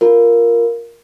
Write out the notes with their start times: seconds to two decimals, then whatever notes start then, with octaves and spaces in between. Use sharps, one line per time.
0.01 F4 A#4